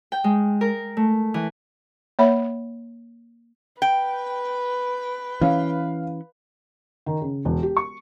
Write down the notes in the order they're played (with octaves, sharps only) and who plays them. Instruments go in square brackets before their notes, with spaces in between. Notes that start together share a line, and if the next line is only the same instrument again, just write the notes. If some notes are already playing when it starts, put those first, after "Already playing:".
[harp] G5
G#3
A#4
A3
E3
[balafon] A#3 C#5 E5 B5
[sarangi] B4 [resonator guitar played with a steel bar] G5
[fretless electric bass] E3 C#4 [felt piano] F5
[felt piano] D#3
C#3
E1
G4
C#6